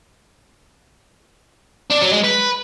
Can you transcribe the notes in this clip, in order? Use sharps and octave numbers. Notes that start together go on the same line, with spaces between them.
D4
F#3
G#3
B4